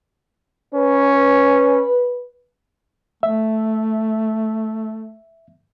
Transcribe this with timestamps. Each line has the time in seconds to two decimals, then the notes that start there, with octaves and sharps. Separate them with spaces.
0.74 C#4 B4
3.23 A3 E5